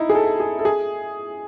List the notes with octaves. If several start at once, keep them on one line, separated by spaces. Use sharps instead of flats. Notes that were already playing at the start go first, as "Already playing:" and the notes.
Already playing: D#4 E4
G#4
A4
G#4
A4
G#4